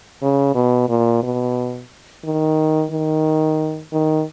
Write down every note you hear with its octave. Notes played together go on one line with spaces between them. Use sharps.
C#3
B2
A#2
B2
D#3
D#3
D#3